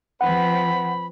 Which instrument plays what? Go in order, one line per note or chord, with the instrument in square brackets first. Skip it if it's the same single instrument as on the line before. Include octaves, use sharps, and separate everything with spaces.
[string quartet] F3 C4 B4 [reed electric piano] F#5 [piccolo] B5